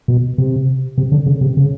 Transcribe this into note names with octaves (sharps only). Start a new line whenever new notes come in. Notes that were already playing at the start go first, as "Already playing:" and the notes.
B2
C3
C3
D3
C#3
C3
C#3